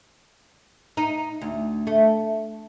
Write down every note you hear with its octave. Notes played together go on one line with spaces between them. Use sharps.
D#4
D2
A3